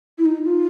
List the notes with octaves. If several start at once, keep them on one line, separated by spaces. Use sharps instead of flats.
E4
D#4
F4